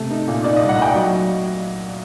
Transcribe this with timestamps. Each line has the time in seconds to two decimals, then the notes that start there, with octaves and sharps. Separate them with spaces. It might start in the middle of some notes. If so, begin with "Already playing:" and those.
Already playing: C3 A3
0.10 D#4
0.28 A#2
0.44 D#4 D5
0.56 D#5
0.61 C2
0.69 F#5
0.78 A3 G5
0.95 F#3 D#5